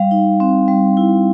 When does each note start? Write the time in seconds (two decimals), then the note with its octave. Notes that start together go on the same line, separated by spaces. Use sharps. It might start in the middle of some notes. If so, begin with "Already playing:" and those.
Already playing: G3 F5
0.11 D#4
0.40 C4
0.68 G3
0.97 E4